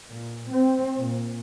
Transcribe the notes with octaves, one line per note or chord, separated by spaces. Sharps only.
A#2
C4
A#2